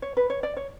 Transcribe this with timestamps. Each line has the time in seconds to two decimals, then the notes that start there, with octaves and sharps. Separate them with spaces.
0.02 C#5
0.17 B4
0.30 C#5
0.43 D5
0.57 C#5